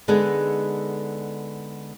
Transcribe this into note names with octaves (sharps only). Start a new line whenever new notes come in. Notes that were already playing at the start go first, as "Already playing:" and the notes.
D3 G#3 B3 D#4 G#4 A4